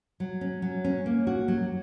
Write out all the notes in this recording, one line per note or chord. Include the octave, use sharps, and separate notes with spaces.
F#3
C#4
F#3
C#4
A#3
F#4
F#3